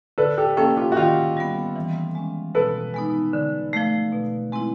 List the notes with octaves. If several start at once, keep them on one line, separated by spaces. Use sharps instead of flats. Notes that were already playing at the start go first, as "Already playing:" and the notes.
D3 A4 B4
G4 A4
F3 A#3 C#4 G4 A4
F4 G4
F#4
D#3 F4 G4
G3 B3
E3
G#3 C#4
B2 A4 B4
G#3 B3 D#4
D3
F3 A3
B2
G#3 C4 E4